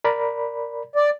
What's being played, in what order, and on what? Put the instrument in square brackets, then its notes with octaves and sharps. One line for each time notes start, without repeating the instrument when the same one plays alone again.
[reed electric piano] A#4 D5 B5
[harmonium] D5